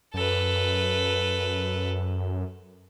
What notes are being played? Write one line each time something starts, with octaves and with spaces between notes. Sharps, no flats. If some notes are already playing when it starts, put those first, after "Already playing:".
F#2 A4 B4